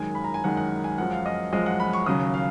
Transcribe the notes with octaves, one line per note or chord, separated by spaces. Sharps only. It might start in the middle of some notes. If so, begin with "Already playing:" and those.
Already playing: F#2 D#3 G#3 G#5
B5
A#5
G#5
F#2 D#3 G#3 F#5
F#5
G#5
F#2 F3 G#3 F#5
F5
D#5
F#2 F3 G#3 D#5
F#5
B5
C#6
D#2 C#3 F#3 D#6
F5